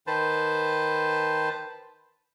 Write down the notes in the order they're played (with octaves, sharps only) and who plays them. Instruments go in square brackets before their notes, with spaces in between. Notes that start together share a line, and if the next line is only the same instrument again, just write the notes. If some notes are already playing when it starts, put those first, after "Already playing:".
[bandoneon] D#3 B4 C5 A5